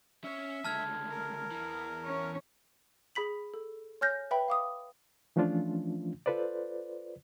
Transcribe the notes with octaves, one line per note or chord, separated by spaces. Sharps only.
C#4 C#5 E5
C#2 D3 A5 F6 G#6
A#4
E2 E3
C#4 C#5
G#4 B5 B6 F#7
A4
C#5 G#5 F6 G6 A#6
B4 E5 G5 B5
F5 D6 D#6
E3 F3 A3 C#4 D4 F4
F4 A4 B4 C5 D5